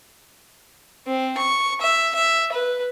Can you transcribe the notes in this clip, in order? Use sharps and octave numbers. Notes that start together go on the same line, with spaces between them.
C4
C#6
E5
E5
B4